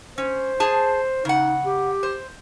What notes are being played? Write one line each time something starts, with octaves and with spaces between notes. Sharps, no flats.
C#4 C5
G#4 A5
C#3 D#4 F#5
G4
C5